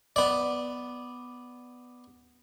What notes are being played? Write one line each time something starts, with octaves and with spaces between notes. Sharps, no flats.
B3 D5